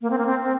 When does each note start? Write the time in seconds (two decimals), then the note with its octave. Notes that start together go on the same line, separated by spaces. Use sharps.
0.02 A#3
0.10 C4
0.18 A#3
0.26 C4
0.43 C4